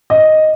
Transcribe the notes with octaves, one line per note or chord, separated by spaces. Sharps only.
D#5